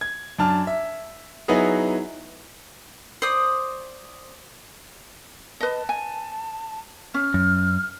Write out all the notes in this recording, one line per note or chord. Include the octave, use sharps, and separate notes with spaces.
G#6
F#2 D4 A5 F6
E5
F#3 B3 D#4 E4 F#4 G#4
C5 D5 D#6
B4 D#5 A5
G#5
C#4 F6
F#2